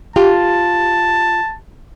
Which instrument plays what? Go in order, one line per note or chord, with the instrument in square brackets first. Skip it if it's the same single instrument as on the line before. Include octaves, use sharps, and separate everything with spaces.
[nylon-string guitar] F4 [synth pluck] G4 [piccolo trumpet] A5